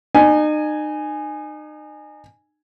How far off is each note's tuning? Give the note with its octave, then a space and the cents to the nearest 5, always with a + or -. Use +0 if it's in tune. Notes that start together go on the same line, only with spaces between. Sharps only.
D#4 -35 G#5 +0